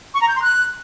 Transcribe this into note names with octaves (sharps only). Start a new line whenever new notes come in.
C#6
A#5
G6
C6
F#6